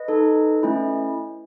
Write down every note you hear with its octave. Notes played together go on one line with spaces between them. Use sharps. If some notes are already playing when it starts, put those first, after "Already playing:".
Already playing: B4 D#5
D#4 A4
A3 C#4 E4